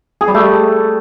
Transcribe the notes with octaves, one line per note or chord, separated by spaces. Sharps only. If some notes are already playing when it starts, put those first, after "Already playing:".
G#4
G3
A3